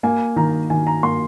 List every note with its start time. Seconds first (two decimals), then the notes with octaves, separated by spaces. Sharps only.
0.03 A#3 G#5
0.36 D#3 A#5
0.70 D#3 G#5
0.87 A#5
1.03 A#3 C6